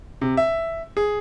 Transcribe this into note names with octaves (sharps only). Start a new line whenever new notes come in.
C3
E5
G#4